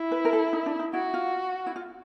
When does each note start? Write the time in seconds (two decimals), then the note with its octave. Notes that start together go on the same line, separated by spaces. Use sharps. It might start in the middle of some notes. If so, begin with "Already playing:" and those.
Already playing: E4
0.11 B4
0.25 A#4
0.33 A4
0.53 D#4
0.66 D4
0.79 D#4
0.93 E4 F#4
1.14 F4
1.66 E4
1.76 F4